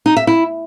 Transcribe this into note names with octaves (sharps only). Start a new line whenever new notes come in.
D#4
E5
E4